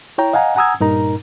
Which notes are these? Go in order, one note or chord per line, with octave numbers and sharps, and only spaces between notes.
E4 C#5 G5 A#5
D#5 F5 F#5 G#5 A#5
F#5 G#5 A#5 D#6 E6 G#6
G2 A#2 D#4 A#4 A#5